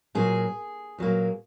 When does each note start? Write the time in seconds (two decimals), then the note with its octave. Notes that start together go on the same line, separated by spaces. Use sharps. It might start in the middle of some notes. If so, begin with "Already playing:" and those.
0.15 A#2 F#3 A#3 G#4
0.98 A#2 F#3 A#3